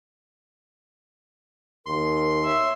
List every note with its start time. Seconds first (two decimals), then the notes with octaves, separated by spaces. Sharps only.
1.86 D#2 A#4 C6
2.45 C#5 E5